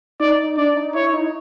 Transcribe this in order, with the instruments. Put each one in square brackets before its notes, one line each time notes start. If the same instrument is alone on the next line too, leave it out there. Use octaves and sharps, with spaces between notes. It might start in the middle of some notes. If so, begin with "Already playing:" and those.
[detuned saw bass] D#4 [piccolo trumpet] D5
[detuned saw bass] D4 [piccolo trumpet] D5
[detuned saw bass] D#4
[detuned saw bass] E4 [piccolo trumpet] C#5
[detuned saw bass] D#4